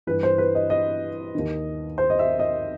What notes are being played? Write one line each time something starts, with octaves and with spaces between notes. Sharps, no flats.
G2 E3 B4
C5
B4
D#5
D#5
D#2 D#3
C5
D#5
E5
D#5